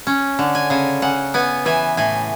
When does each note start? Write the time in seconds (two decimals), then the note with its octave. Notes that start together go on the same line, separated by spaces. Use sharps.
0.07 C#4
0.39 D3
0.55 G#5
0.70 C#3 G#5
1.02 C#3 F#5
1.34 B3 G#5
1.65 E3 G#5
1.97 A2 G#5